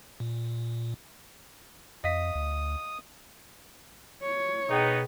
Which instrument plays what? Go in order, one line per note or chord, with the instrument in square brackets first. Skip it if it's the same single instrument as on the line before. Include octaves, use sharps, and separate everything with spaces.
[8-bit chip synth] A#2
[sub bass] F2 [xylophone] D#5 F5 B6 [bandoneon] D#6
[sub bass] D2
[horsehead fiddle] C#5
[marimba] B2 G#4 G5 [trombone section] B3 D#4